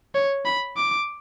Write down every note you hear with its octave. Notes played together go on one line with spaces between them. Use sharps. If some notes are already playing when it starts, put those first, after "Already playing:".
C#5
B5
D6